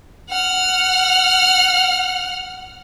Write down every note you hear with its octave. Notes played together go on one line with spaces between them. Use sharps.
F#5 F6